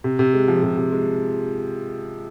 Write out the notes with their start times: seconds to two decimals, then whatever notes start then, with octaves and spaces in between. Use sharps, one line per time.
0.04 C3
0.19 C3
0.34 G#3
0.48 F3
0.63 C3
0.77 C3
0.92 G#3